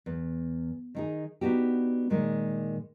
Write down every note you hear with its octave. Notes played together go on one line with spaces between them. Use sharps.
E2
D#3 D#4 G#4
B3 D4 D#4 F#4 G4
A#2 D#3 G#3